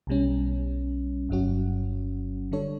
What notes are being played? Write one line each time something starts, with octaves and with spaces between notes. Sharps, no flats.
B1 B2 G3 C#4
G1 G2 F#3 C#4 F#4
D3 G3 D4 A4 C#5